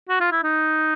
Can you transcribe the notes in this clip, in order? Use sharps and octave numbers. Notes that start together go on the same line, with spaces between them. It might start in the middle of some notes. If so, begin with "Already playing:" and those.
F#4
F4
E4
D#4